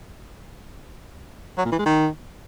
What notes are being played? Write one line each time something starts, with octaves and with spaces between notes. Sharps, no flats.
F#3
A#2
E3
G#3
D#3